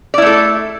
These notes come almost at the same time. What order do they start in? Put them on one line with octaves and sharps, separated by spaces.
D5 E4 A3 A4